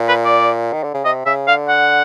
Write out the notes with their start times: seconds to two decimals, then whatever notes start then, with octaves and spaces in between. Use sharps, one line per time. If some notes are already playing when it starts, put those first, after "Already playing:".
Already playing: A#2
0.08 B4
0.25 D5
0.73 D#3
0.84 D3
0.94 C#3
1.04 C3 D#5
1.26 C#3 E5
1.47 D3 F5
1.68 F#5